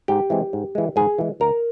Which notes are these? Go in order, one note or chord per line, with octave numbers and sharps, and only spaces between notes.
G#2 G4 G5
E3 G#3 C4
G#2
E3 G#3
G#2 G#4 G#5
E3 G#3
D2 A#4 A#5